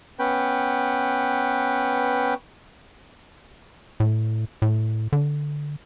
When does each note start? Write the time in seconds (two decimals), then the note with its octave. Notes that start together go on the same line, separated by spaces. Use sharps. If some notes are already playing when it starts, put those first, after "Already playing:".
0.19 B3 C#4 B4 G5
4.00 A2
4.62 A2
5.13 D3